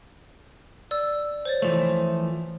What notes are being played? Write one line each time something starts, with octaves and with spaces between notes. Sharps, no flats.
D5 E6
C5 C#5 A6
E3 F3 A3